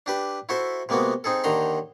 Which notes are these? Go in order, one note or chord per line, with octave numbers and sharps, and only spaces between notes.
D4 G4 B4
E4 F#4 A4 C5 E5
C3 G#3 A#3 B3 F#4
C4 D#4 G#4 A4
D#2 D3 D#3 A#5 C6